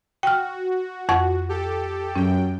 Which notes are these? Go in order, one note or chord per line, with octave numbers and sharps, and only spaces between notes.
F#4 G5 F6
F2 F#5 C#6
G4 A4
F#2 C#4 G5